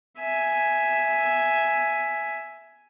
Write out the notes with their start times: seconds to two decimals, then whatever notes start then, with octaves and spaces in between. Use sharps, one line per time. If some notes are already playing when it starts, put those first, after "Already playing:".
0.18 E5 G#5